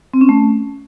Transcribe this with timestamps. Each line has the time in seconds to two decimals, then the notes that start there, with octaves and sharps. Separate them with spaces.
0.14 C4
0.21 C#4
0.29 A3